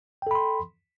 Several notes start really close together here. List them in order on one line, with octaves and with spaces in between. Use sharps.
G5 A4 B5 C6